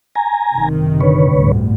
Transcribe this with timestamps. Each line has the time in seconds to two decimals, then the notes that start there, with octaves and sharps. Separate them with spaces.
0.15 G#5 A#5
0.54 F#1 C3 D#3
1.00 D3 B4 C#5
1.32 G1 D2 A2